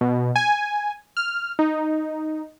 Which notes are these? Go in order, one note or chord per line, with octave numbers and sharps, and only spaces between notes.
B2
G#5
F6
D#4